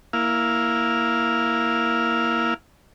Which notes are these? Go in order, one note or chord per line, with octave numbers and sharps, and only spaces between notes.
A#3 E4 F5